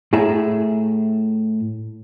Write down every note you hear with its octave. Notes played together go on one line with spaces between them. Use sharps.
A2 E4 G#4 E5 A#5